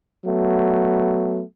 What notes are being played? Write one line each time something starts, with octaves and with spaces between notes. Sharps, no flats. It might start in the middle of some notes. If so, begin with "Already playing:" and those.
F#3 A3 B3